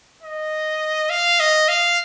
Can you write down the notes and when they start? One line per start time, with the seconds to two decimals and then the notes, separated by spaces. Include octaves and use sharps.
0.23 D#5
1.10 F5
1.40 D#5
1.69 F5